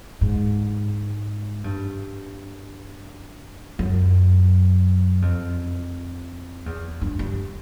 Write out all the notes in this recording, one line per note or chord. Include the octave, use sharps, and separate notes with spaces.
G#2
G2
F#2
F2
E2
G2
G2